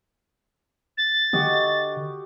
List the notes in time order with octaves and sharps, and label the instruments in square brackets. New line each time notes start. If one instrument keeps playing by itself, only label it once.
[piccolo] A6
[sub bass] D3 [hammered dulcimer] F#4 G4 D#5